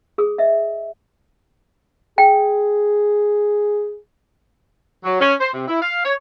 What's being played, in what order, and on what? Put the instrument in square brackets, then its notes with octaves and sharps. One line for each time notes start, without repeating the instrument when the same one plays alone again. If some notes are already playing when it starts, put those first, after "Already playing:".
[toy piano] G#4 D#6
D#5 E5
[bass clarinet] G#4 [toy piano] G5
[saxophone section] F#3
C#4
C5
C3
E4
F5
C#5